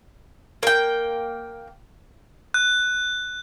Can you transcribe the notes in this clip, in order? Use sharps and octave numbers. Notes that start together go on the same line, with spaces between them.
A#3 G5
F#6